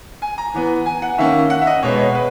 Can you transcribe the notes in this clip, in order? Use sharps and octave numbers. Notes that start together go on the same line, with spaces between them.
G#5
A#5
E3 B3
G#5
F#5
D#3 A#3 C#4 E5
F#5
E5
D#5
B2 G#3 B3 C#5
C#5
B4